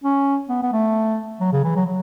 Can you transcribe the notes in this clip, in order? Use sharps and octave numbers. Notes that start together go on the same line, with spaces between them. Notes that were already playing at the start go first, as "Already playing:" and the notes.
C#4
B3
B3
A3
F#3
C#3
E3
F#3
F#3